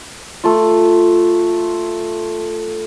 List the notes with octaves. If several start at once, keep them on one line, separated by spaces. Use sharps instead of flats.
A3 F4